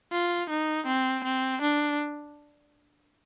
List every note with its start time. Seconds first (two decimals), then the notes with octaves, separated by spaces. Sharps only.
0.12 F4
0.50 D#4
0.87 C4
1.24 C4
1.62 D4